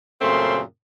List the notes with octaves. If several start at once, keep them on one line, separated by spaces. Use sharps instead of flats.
F#2 A#2 C#3 A3 C4 C6